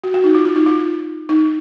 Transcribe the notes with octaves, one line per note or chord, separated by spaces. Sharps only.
F#4
F#4
D#4
F4
F4
D#4
F4
D#4